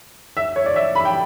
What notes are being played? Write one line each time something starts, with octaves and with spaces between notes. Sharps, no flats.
E5
C#5
D5
E5
B5
G5